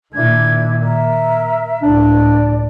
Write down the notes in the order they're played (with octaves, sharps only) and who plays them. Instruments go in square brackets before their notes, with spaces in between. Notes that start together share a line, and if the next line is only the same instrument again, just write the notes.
[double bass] A#2 D#3 [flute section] D4 E4 G#6
[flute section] A#4 E5
[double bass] C#2 A2 [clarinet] D4 [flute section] D5